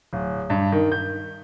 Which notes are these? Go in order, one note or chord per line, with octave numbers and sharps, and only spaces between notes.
D1
G2
D#3
G6